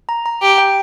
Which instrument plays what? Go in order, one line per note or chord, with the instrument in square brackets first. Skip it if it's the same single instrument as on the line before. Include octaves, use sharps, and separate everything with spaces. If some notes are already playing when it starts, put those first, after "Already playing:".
[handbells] A#5
A#5
[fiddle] G4
[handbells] G5